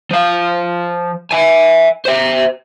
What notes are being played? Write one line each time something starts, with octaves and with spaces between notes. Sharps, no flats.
F3 F5
E5 G#5
C5 E5